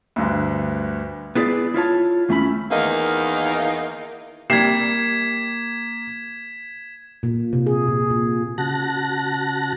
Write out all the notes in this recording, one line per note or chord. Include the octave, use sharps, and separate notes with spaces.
D2 G2 D3
B3 E4 G#4 D5
E4 F4 C#5 A5
D#2 A3 C#4 E4 B5
E2 D#3 A#3 D#4
C3 G3 A#3 G#6 B6 C7 E7
A#2
C3
G#4
A#2
A#2
C#3 F#4 A5 F#6 A#6